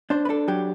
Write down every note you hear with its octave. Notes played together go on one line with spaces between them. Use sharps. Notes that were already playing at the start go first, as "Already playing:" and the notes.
D4 C5
B4
D4 A4
F#3 G4